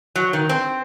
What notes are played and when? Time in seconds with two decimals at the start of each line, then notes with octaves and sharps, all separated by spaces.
0.16 F#3
0.33 D#3
0.49 C4